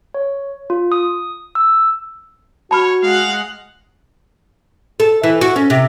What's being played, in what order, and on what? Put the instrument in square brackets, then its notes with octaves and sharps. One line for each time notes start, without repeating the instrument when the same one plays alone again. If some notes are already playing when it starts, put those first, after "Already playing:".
[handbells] C#5
F4
D#6
E6
[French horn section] F#4 [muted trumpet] C#5 [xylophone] A5 B5 F6
[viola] G#3 F#5 [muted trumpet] F5
[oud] A4
E3
F#4
C#4
C3